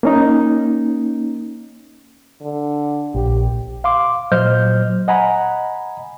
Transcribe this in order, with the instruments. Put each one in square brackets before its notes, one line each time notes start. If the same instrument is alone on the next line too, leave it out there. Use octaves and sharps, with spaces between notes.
[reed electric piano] A#3 C#4 D#4
[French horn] D3
[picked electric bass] A#1 [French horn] G4
[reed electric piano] F5 C6 D6
A#2 F#3 C5 D#5 F6 G6
D#5 F#5 G#5 A#5 B5